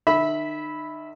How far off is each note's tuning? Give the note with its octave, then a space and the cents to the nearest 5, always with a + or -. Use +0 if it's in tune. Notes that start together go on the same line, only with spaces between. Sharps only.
D#3 -40 E5 -15 B5 +0